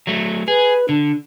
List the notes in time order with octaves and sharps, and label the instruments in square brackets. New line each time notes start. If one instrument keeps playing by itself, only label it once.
[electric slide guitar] F#3 A3
[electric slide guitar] G#4 [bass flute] B4
[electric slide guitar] D3 [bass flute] D4